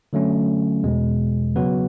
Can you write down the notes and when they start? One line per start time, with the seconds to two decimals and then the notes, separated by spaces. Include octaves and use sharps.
0.13 D3 F#3 A3 C#4
0.84 E2 B2 G#3
1.56 C#3 F#3 B3 F#4 B4